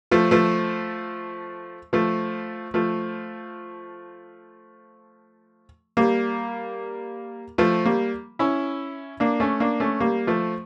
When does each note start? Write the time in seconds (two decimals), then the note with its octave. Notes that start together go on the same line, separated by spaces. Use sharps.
0.11 F3 A3
0.31 F3 A3
1.93 F3 A3
2.74 F3 A3
5.97 G3 A#3
7.58 F3 A3
7.85 G3 A#3
8.39 C#4 E4
9.20 A#3 D4
9.40 A3 C#4
9.60 A#3 D4
9.80 A3 C#4
10.00 G3 A#3
10.27 F3 A3